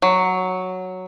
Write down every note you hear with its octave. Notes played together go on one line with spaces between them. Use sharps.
F#3